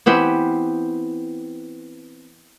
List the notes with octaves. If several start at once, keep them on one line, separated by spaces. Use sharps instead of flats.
E3 B3 C4 G4